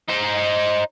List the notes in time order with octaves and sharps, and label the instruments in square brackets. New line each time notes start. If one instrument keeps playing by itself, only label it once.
[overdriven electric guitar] D#4 C5